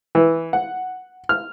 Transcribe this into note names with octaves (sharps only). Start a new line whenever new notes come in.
E3
F#5
F6